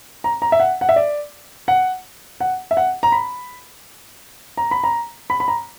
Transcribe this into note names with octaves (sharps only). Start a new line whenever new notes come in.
A#5
A#5
E5
F#5
F#5
E5
D5
F#5
F#5
E5
F#5
A#5
B5
A#5
B5
A#5
B5
B5
A#5